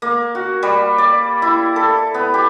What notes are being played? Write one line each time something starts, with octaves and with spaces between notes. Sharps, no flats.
A#3
F#4
G3
D5
E4
A4
B3
G4